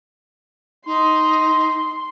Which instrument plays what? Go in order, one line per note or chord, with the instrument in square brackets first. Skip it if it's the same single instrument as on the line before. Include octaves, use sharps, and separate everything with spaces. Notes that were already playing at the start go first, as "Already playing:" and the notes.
[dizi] D#4 [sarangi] C6